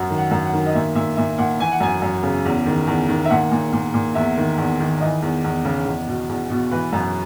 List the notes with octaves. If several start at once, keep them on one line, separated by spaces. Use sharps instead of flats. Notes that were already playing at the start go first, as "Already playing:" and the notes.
Already playing: F#2 F#5
D#3
F#5
F#2
F#5
D#3
D#5
A#2 E5
A#2 E5
A#2 E5
A#2 F#5
E3 G#5
F#5
F#2 G#5
F#2
C#3
E2
D#3
E2
D#3
E5
A#2 F#5
A#2
A#2
A#2
E2 E5
D#3
E2
D#3
E3 D#5
E2
E2
C#3
E2
B2
E2
B2
E3 B4
F#2